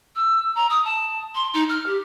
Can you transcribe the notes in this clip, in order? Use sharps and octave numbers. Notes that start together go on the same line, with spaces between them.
E6
A#5
D#6
A5
C6
D#4
F6
G4